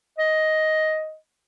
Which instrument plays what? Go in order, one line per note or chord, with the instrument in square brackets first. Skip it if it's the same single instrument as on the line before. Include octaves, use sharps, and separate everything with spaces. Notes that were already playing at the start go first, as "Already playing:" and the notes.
[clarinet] D#5